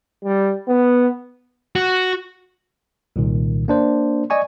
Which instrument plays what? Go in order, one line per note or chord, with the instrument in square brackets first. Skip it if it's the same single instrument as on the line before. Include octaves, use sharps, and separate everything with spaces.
[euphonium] G3
B3
[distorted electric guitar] F#4
[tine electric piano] C2 A#2 D#3
A#3 D4 C5
D5 D#5 G#5 C#6